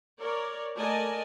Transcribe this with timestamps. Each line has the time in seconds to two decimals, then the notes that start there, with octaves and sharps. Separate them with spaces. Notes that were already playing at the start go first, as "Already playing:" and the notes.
0.20 A#4 C#5 D5
0.77 A3 A#4 D5 D#5 G#5 A5